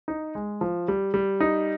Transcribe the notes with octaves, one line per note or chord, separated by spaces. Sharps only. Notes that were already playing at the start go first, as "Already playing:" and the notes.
D#4
G#3
F3
G3
G3
D#4